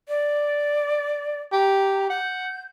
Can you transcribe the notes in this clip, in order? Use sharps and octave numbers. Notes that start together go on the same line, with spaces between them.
D5
G4 A#5
F#5 G6